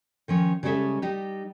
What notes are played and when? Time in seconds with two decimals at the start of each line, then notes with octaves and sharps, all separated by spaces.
0.28 D#3 F3 C#4
0.63 C#3 G3 G#3 C#4 A4 E5
1.02 G3 D#4 G4